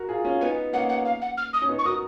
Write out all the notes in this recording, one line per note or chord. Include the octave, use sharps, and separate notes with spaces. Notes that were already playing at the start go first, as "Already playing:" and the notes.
Already playing: F#4 A#4
F4 G#4
C#4 F4
B3 D#4 G#5
A#3 C#4 F#5
F#5
F5
F#5
F6
D#6
C#4
B3 D#4
C#6
F#4 A#4 D#6